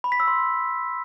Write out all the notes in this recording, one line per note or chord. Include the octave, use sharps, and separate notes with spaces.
B5
B6
E6
C6